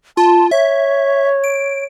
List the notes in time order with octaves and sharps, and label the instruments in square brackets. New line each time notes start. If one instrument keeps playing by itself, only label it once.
[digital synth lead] F4 [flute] A5
[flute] C#5 [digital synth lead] E5
[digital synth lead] D7